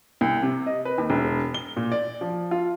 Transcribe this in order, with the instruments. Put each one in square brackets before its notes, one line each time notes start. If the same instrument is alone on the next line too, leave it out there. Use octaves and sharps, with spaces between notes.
[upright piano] C2
C3
D#5
B4
D#2
E1
G7
A#2
D5
F3
F4